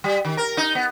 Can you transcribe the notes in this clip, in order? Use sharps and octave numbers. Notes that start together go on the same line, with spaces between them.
G3
D#3
A#4
D#4
B3